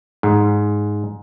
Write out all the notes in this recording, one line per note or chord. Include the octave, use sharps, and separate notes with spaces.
G#2